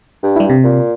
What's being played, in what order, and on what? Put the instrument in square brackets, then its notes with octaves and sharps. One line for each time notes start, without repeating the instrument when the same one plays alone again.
[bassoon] G2
[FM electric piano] G3 E4
C3
[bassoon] A#2